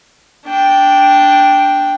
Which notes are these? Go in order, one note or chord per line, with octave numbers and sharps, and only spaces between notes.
D4 G5